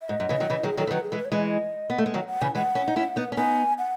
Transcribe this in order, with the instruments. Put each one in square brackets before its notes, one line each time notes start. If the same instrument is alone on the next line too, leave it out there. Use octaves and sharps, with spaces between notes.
[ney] E5
[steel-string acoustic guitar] G#2 [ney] D#5
[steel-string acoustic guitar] F#2
C#3 E3
D#3 F#3
C#3 E3
[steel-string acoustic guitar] D#3 F#3 [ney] G#4
[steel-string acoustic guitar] D#3 F#3 [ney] A4
[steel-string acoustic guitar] E3
[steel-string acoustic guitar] D#3 F#3 [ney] B4
[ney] G#4
[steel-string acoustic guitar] E3 G#3 [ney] A4
[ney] B4
C#5
[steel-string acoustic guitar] E3 G#3 [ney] D#5
[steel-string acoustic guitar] B3
A3
G#3
[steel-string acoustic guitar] D#3 F#3 [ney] F#5
[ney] F#5
[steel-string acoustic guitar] C#3 E3 [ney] G#5
[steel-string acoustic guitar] E3 G#3 [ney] F#5
[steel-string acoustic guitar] C#4 E4
D#4
C#4 E4
B3 D#4
C#4
[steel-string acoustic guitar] B3 D#4 [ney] G#5
[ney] F#5